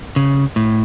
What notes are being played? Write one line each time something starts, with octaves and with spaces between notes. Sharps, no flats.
C#3
A2